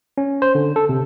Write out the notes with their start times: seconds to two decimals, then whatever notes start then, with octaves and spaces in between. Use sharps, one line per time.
0.18 C#4
0.42 C5
0.55 D3
0.76 A4
0.89 C3